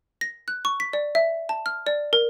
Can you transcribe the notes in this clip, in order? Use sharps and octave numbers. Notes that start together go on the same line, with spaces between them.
A#6
F#6
C#6
B6
D5
E5
A5
F6
D5
A#4